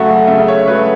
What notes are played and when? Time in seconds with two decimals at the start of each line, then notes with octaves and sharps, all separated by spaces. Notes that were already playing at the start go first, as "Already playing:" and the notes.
Already playing: C#3 F#3 A3 E5 F#5
0.27 C#3 E5
0.48 C#5
0.68 F#3 A3 B4